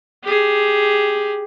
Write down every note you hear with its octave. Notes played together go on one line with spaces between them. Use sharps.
G4 G#4